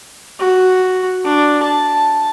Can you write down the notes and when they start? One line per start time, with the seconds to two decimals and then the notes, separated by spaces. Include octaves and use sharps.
0.39 F#4
1.24 D4
1.62 A5